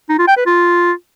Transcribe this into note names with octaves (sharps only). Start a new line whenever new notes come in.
D#4
F4
G5
B4
F4